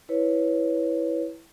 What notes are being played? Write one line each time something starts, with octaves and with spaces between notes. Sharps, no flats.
E4 B4 C#5